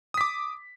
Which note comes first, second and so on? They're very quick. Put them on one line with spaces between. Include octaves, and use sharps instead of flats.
D#6 B6 D6